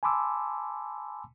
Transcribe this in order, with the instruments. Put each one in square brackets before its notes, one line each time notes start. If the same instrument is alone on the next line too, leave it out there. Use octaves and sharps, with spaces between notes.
[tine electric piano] G#5 A5 B5 C6 D6 E6